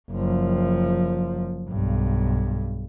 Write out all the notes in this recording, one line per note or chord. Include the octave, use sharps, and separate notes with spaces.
F#1 F3
B1 G2